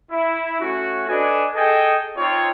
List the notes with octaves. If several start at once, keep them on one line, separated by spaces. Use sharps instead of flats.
E4
A3 C#4 F#4
D4 A4 B4 D#5 G#5
G#4 A4 D#5 G5 G#5
C4 D#4 F4 C#5